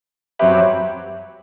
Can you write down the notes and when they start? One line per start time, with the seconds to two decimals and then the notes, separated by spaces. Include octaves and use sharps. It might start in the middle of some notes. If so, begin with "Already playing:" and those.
0.39 F#2 F#3 C4 G4 B4 E5